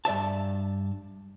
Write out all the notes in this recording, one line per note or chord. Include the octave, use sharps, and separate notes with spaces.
G2 D5 E5 A5